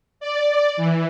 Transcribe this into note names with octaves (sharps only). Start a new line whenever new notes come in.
D5
E3